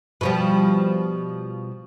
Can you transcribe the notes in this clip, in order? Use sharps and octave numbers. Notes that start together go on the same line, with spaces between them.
B2 F3 G3